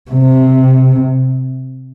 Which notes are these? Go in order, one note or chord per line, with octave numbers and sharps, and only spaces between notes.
C3